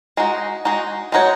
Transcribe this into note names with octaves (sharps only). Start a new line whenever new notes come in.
G#3 D#4 F#4
G#3 D#4 F#4
G#3 D#4 F#4 C#5